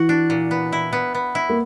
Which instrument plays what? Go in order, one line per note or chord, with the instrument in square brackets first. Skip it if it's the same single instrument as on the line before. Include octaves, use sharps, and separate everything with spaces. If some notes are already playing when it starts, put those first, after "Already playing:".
Already playing: [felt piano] E3 [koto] F#4
[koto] D4
A#2
B3
E4
B3
B3
E4
[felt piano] A#3